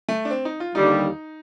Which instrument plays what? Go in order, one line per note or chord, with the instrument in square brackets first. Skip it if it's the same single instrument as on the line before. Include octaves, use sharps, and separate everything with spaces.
[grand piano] A3
D4
C4
D#4
F4
[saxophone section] D#2 D3 G3 [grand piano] D#4